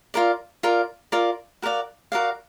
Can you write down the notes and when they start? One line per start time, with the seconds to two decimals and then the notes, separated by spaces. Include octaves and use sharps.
0.14 F4 A#4 D5
0.63 F4 A#4 D5
1.12 F4 A#4 D5
1.62 F#4 A#4 D5 F5
2.12 F#4 A#4 D5 F5